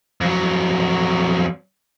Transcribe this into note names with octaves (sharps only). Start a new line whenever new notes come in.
F2 F#3